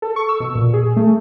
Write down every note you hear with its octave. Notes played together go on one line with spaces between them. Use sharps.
A4
C#6
E6
B2
A#2
G#4
A3